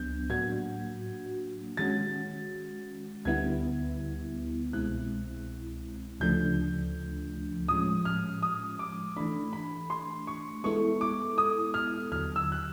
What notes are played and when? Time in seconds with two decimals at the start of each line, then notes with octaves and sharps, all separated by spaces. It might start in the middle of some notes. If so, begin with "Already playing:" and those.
Already playing: C#2 F#3 B3 D4 G6
0.30 A2 F#3 A#3 D4 F#4 G#6
1.77 D#3 G#3 C#4 F#4 A6
3.25 D2 D3 G3 B3 E4 G#6
4.73 C2 B2 G#3 C4 E4 F#6
6.20 D2 C#3 F3 A3 D4 G6
7.68 A2 F3 G#3 C#4 D#6
8.05 F6
8.42 D#6
8.79 D6
9.17 E3 A3 D4 B5
9.53 B5
9.90 C6
10.27 C#6
10.64 G#3 B3 E4 A4 C#6
11.01 D6
11.38 D#6
11.74 F6
12.12 D#2 D3 F#3 F6
12.36 E6
12.52 F#6